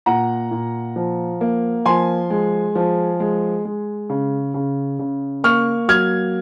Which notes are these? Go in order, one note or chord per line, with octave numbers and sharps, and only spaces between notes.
A#2 F#5 A#5
A#2
F3
A#3
F3 G#5 C6
G#3
F3
G#3
G#3
C#3
C#3
C#3
A#3 C#6 F6
F#3 F6 G#6